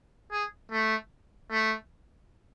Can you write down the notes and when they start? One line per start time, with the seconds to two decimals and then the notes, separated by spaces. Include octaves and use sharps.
0.32 G#4
0.72 A3
1.51 A3